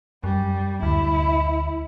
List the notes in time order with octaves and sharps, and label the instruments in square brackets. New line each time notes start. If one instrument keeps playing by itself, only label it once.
[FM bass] F#2 [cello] G3
[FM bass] D2 [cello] E4